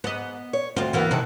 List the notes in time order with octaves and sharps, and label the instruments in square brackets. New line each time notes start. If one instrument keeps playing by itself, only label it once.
[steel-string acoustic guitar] G#2 [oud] B3 D#5
[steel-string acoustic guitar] C#5
[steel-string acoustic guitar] D2 C4 [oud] F4
[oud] E3 A#3 B3
[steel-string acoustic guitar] C3 D#3 A4 [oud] E4